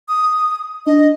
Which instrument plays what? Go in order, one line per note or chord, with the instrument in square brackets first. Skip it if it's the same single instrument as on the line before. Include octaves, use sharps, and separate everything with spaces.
[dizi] D#6
[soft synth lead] D4 [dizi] D#5